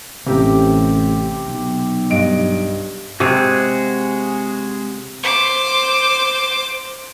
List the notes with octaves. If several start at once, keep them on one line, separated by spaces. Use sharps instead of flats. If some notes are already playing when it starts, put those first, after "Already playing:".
A1 C3 G4
B1
G2 D#5 D7
C3 G#3 F#4 G#4
C5 D6